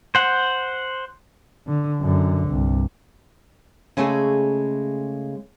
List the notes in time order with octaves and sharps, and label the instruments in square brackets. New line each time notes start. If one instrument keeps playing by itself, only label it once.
[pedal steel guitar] C5 F#5
[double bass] D3
F#2 D3
C2 G2
[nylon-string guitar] C#3 G#3 A3 G#4 A4